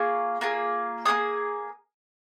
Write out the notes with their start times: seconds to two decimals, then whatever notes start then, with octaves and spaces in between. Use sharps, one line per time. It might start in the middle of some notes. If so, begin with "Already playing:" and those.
Already playing: A#3 F4 G#4 C#6
0.41 A#3 F4 G#4
1.06 A#3 F4 G#4 D#6